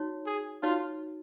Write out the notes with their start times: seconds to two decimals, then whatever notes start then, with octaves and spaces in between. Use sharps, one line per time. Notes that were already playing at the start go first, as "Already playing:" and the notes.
Already playing: D#4 F#4 C#5
0.26 G#4
0.63 D#4 F4 F#4 C#5